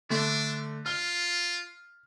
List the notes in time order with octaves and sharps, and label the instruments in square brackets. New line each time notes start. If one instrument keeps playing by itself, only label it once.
[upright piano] D3 A3 [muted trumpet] D4
[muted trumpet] F4 [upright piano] F6 G7